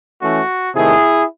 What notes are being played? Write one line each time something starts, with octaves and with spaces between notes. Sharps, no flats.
E3 A3 C#4 F#4
C3 D#3 A3 E4 G#4